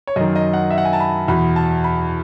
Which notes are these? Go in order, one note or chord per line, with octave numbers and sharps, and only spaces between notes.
C#5
F#2 D#3 D#5
D#5
F#5
E5
F#5
G#5
A5
B5
E2 B2 B5
A5
B5